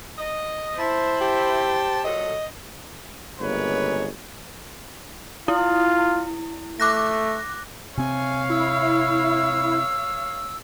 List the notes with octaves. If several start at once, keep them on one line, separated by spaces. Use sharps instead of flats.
D#5
E4 C5 A5
G4 A5
A#2 F#3 A4 D#5
G1 C#3 G#3 A#3 B4 C#5
E4 F4
A3 D6 F#6 A#6
C3 C4 C#5 F5 G#5
E4 E6